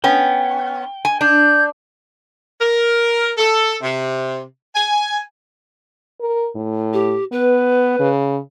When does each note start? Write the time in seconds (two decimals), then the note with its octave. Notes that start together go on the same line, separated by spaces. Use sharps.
0.04 B3 C#4 G5
1.05 G#5
1.21 D4 G6
2.60 A#4
3.38 A4
3.82 C3
4.76 G#5
6.21 A#4
6.55 A2
6.93 G4
7.32 B3 B4
7.99 C#3